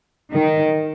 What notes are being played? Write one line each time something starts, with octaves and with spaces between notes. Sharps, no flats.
D#3